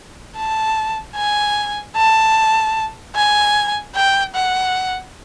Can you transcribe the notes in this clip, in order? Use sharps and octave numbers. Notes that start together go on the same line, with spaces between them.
A5
G#5
A5
G#5
G5
F#5